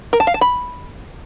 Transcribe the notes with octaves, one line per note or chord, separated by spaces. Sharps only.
A#4
A5
F5
A5
B5